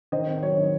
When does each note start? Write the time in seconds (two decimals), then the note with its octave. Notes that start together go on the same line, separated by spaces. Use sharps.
0.12 D#3 C5 D#5
0.28 C4
0.37 D#5
0.42 F#3 C#5
0.57 D#3